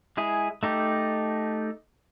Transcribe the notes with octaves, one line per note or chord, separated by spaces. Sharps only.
G#3 E4 G#4
A3 D#4 G4